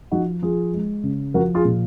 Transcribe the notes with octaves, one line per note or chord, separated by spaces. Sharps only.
F3 D#4 F#4
F3 F4 G#4
G#3
C#3
F3 F#4 A#4
F4 G#4
A#2